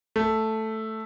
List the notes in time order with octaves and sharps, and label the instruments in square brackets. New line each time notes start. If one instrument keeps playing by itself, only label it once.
[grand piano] A3